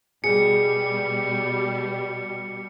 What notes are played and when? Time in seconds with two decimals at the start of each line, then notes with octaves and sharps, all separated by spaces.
0.24 B2 G3 G#4 C#7